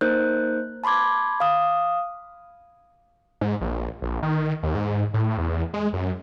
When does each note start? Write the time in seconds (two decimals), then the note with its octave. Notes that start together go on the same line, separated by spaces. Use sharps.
0.01 A#3 D#4 A#4 C5 F#6 G6
0.84 A5 B5 C6 D6 G#6
1.40 F5 D#6
3.41 G#2
3.61 A#1
4.02 A#1
4.23 D#3
4.63 D#2
4.75 G#2
5.14 A2
5.38 E2
5.74 G#3
5.93 F#2